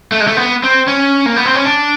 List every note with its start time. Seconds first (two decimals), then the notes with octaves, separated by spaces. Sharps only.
0.12 A3
0.20 G#3
0.27 A3
0.37 B3
0.63 C4
0.88 C#4
1.26 A#3
1.36 B3
1.46 C4
1.55 C#4
1.65 D4